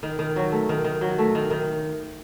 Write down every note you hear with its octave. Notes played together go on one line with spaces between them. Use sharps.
D#3
D#3
F#3
A3
D#3
D#3
F#3
A3
D#3
D#3